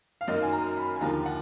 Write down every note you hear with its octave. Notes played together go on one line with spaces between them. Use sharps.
F5
F#2 D#3 F#3 A#3 D#5
G#5
A#5
B5
G#5
D#2 D3 F3 A#3 A#5
F#5